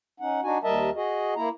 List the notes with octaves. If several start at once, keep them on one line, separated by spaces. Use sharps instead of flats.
C#4 D#4 F#5
D4 D#4 F#4 G#5
D#2 G3 A#4 D#5 E5 A5
F#4 G#4 D#5
A#3 E4 A#5